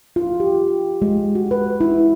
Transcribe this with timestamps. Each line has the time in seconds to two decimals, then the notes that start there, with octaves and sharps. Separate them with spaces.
0.16 F4
0.40 G4
1.02 G#3
1.35 F#4
1.51 B4
1.81 E4